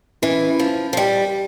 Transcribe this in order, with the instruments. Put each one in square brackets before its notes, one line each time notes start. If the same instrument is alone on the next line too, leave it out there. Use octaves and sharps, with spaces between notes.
[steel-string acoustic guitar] E3 [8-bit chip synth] C#4 E4
[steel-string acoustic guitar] F3
F3
G3